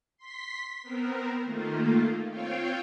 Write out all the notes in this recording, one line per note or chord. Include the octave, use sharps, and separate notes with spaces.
C6 B6
B3 C4 A#4
D#3 A3 A#3 F4
C4 F4 C#5 F5 G5